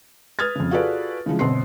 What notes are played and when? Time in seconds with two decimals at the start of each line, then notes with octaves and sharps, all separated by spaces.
0.39 B4 D#6 F6 G#6 A6
0.56 F2 C#3
0.71 F4 F#4 G#4 A4 B4 D5
1.26 C#3 E3 F3 G#3
1.39 G1 B2 C4 C6 C7